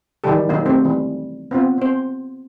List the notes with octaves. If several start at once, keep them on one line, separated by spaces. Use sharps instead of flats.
D#3 E3 F#3 G3 G4 A4
D#3 F#3 A#3 D#4
A3 C4 G4
E3 G3
B3 C4 F4
C4 C5